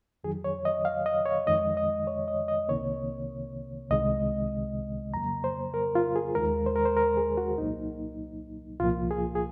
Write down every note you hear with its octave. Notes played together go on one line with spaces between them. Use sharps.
F2 D#3 F#3 G#4
C#5
D#5
F5
D#5
C#5
F2 D#3 G#3 D#5
D#5
C#5
D#5
D#5
C2 C3 D#3 A#3 C#5
C2 C3 D#3 G#3 D#5
F2 C#3 F#3 A#3 A#5
C5
A#4
F4
G#4
D#2 D#3 G#3 A#4
C5
A#4
C5
A#4
G#4
F#4
C2 A#2 F#3 A#3 D#4
C2 A#2 F3 A#3 F4
G#4
G#4